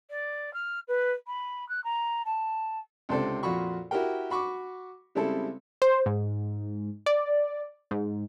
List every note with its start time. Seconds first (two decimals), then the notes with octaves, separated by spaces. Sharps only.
0.10 D5
0.54 F6
0.88 B4
1.27 B5
1.69 F#6
1.84 A#5
2.25 A5
3.09 C#2 C3 D4 A4 C5 D5
3.43 F2 A#2 F#4 B5 C#6
3.91 E4 F#4 G4 A#4 G5
4.30 F#4 B5 C#6 D6
5.15 C#3 G3 G#3 C4 E4 A4
5.82 C5
6.06 G#2
7.06 D5
7.91 G#2